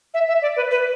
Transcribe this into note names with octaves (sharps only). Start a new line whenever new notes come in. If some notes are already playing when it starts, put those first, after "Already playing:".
E5
E5
D5
B4
B4